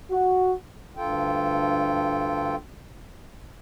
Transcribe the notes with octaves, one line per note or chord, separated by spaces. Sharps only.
F#4
D2 G2 F4 A4 G5